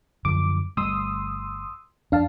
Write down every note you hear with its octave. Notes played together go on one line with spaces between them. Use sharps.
F#2 D3 F3 D6
G1 G3 A3 C6 D#6 E6
F2 D4 F5 A5